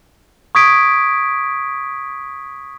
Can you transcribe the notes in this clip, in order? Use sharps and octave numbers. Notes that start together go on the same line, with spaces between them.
C#6 D#6 G#6 B6 D7